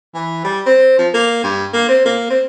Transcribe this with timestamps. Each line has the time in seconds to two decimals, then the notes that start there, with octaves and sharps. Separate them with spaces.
0.14 E3
0.44 G3
0.66 C4
0.98 F3
1.14 A#3
1.44 G2
1.74 A#3
1.88 C4
2.06 A#3
2.30 C4